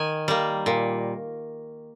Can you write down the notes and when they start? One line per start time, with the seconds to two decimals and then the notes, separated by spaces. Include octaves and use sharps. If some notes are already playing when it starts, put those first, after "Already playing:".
Already playing: D#3 G#5
0.28 G3 A#3
0.66 A#2